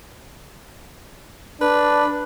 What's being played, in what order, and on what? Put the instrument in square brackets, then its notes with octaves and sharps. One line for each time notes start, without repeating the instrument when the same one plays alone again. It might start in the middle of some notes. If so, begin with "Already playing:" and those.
[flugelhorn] D4 [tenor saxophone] B4